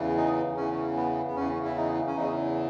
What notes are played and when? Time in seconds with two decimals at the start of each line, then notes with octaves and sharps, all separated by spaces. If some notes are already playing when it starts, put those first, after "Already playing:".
Already playing: E2 C#3 E3
0.17 D#4
0.57 E2 C#3 E3 C#4
0.96 B3
1.28 B3
1.36 E2 C#3 E3 C#4
1.65 E4
1.77 D#4
2.07 C#4
2.16 E2 C#3 E3 D#4